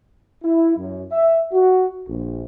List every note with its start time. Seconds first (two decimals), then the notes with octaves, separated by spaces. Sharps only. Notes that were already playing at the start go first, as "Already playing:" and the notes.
0.43 E4
0.77 F#2
1.11 E5
1.52 F#4
2.07 A#1